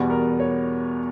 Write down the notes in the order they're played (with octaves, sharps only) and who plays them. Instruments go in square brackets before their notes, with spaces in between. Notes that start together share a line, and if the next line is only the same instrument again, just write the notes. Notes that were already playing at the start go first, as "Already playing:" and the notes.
Already playing: [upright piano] E2 B2 G3 B3
A#4
C#5